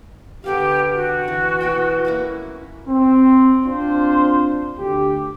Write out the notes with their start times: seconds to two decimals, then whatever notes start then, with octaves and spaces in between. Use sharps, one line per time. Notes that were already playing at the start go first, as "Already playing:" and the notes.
0.44 D3 B3 G4 F5
0.95 F#4
1.28 E3
1.61 B2 C#5 G5
2.05 A#3 C#4 E4
2.87 C4
3.64 C4 D4 F4 C5
4.78 D2 G4